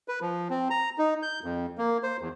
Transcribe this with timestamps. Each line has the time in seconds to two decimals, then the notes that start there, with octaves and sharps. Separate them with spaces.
0.08 B4
0.22 F3
0.50 C4
0.70 A#5
0.98 D#4
1.23 G6
1.44 F2
1.78 A#3
2.03 C5
2.21 E2